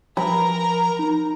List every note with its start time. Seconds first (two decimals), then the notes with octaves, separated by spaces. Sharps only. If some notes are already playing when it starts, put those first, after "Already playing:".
0.17 F3 A#4 A#5 B5
0.99 D#4